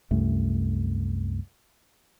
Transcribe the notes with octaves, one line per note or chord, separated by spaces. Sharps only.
C2 F#2 A3